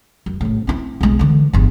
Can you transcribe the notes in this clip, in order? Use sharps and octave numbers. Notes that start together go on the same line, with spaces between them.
F#2
A#1 A2
C4 E4
B1 G#3
D3 E3
G1 E2